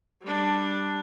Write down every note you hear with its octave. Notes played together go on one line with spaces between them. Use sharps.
G3 D4